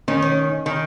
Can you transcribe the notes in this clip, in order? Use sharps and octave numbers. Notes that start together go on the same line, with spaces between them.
D#3 C#4
C#4
D#3